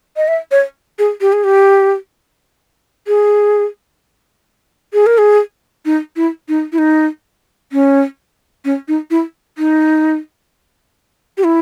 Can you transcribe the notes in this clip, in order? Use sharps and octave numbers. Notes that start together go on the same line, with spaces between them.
D#5
E5
C#5
G#4
G4
G#4
G4
G#4
G#4
A#4
G#4
D#4
E4
D#4
E4
D#4
C#4
C#4
D#4
E4
D#4
G4
E4